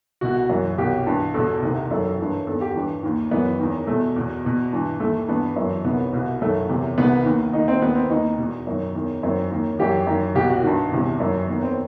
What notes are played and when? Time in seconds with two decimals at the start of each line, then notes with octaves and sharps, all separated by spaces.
0.21 C2 B2 F#4
0.49 F#2 E3
0.78 C2 B2 G4
1.06 G2 E3
1.34 E2 B2 A4
1.62 C2 C3 D#3
1.90 F#2 D#3 A4
2.19 G2 E3
2.47 E2 A4
2.50 D#3
2.61 G4
2.75 G2 E3
3.03 D#2 D#3
3.31 F#2 E3 B3
3.59 E2 D#3
3.87 E2 B2 A3
4.16 E2 B2
4.45 E2 B2
4.73 G2 E3
5.00 D#2 A3
5.04 D#3
5.28 G2 E3 B3
5.56 F#2 E3
5.84 C2 C3 D#3 B3
6.13 C2 B2
6.41 F#2 D#3 A3
6.69 E2 C3 E3
6.98 C2 C3 D#3 B3
7.26 D#2 D#3
7.53 D#2 D#3 D#4
7.68 C4
7.82 D#2 D#3 B3
7.95 C4
8.10 D#2 D#3 D#4
8.38 E2 B2
8.67 F#2 D#3
8.95 E2 D#3
9.23 F#2 D#3 C4
9.51 D#2 D#3
9.79 F#2 E3 G4
10.07 F#2 D#3
10.35 C2 B2 G4
10.50 F#4
10.63 G2 D#3
10.92 E2 C3 E3
11.20 F#2 D#3
11.48 E2 D#3 B3
11.63 C4